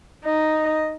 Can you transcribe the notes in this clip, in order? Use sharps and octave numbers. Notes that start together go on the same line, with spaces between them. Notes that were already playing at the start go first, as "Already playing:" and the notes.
D#4 D#5